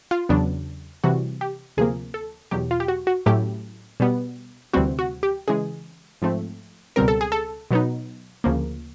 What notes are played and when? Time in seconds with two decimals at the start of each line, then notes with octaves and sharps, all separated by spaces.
0.11 F4
0.29 E2 C#3 F#3 B3 D4
1.04 C3 E3 G3 F#4
1.41 G4
1.77 D2 C3 F3 A#3 G#4
2.14 A4
2.51 E2 B2 F#3 G4
2.71 F4
2.80 G4
2.88 F#4
3.07 F#4
3.26 A2 F#3 A3 C#4 E4 G4
4.00 B2 G3 B3
4.73 D2 C3 E3 G3 C4 F#4
4.99 F#4
5.23 G4
5.48 C#3 E3 G#3 G#4
6.22 G#2 F3 A3 C4
6.96 C#2 B2 G3 C4 A#4
7.08 A4
7.21 G#4
7.32 A4
7.71 B2 F#3 B3 D#4
8.44 D2 C#3 F3 A#3